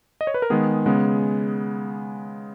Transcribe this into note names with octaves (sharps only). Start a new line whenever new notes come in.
D#5
C#5
B4
A#4
D#3 G#3 B3 G#4
C#3 G#3 B3